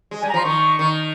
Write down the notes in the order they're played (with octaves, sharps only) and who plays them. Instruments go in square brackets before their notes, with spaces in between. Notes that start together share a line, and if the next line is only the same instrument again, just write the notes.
[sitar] G#3
[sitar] G3 [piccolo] G#5
[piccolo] A#5
[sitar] F3 [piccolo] C6
[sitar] D#3 [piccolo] C#6
[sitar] D#3